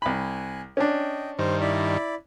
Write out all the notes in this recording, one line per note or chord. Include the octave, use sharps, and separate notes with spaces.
C2 G#5 B5 F#6
C#4 D4 D#5 G5
G2 D#3 C5
E4 D5 B5